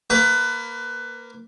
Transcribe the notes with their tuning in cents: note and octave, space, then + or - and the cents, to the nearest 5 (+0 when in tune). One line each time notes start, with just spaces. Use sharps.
A#3 +0 B4 +20